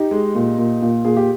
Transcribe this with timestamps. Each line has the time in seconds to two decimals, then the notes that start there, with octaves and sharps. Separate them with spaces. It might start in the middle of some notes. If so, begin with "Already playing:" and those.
Already playing: D#4 G4
0.11 G#3
0.35 A#2
0.58 A#2
0.82 A#2
1.05 A#2 G#4
1.16 G4